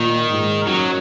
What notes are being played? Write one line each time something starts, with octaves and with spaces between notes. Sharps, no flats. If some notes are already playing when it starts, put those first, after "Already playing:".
Already playing: A#2 D#3
G#2
F#2 F#3